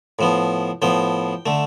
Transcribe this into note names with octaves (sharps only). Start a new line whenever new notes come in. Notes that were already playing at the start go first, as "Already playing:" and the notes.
A2 F3 B3
A2 F3 B3 G5
D3 A3